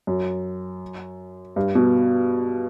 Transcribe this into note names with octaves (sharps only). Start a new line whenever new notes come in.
F#2
G2
B2